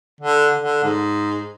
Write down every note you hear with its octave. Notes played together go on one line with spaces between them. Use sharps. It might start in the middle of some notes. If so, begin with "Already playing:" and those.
D3
D3
G#2